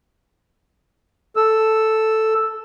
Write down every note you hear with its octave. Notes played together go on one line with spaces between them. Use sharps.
A4 E6